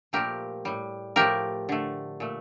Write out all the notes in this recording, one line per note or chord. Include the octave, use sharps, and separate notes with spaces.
A#2 F3 A3 G4 A#4
A2 G3
A2 F3 A3 G4 A#4
D3 A3
A#2 A3